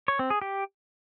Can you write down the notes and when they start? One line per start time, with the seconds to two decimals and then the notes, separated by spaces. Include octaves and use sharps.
0.08 C#5
0.19 C4
0.30 G#4
0.42 G4